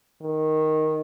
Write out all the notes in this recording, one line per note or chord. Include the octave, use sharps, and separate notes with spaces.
D#3